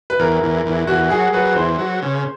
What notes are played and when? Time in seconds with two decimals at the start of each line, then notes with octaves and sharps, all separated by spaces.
0.10 B4
0.19 E2 A#4
0.43 E2
0.66 E2
0.87 E2 F#4
1.10 F#3 G#4
1.33 F#3 B4
1.55 E2 C5
1.78 F#3
2.02 C#3